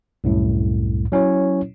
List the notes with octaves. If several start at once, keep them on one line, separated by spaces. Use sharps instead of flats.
C2 F#2 A2
F#3 C#4 E4 C#5